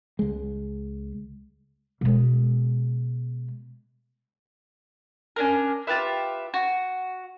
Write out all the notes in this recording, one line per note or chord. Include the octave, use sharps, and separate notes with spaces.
C#2 G#3
B2 G#3
C#4 D4 A#4
F4 G4 B4 E5
F#4